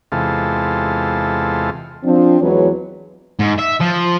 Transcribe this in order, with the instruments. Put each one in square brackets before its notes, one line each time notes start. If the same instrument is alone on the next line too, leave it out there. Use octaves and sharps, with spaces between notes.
[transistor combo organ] E2 C3 G#3 F4 A4
[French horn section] F3 C4 D4
E2 E3 F#3 G#3 B4 C#5
[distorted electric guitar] G#2
E5
F3